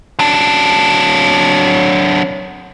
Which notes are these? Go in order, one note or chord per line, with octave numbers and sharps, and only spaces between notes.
F#3 D4